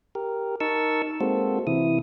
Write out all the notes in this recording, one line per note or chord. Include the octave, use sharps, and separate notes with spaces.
G4 A#4
D#4 A#4 A5 C#6 E6
G#3 A#3 C4 F#4 A4 C5
C3 E3 E4 D#6